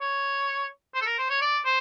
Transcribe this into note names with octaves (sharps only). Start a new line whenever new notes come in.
C#5
C5
A4
A#4
C5
C#5
D5
C5